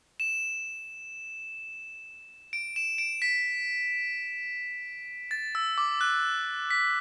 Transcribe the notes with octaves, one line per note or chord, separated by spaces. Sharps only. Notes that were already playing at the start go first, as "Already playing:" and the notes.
E7
D7
E7
D7
B6
A6
E6
D6
F#6
B6